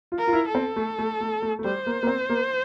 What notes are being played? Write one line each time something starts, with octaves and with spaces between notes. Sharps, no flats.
F4
A#4
F4
E4
A4
C4
A3
A3
A3
A3
A3
G3 C5
A#3
A#3
C4
A#3